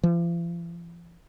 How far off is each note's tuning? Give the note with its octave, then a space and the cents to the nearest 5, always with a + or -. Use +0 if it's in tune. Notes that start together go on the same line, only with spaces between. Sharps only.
F3 -45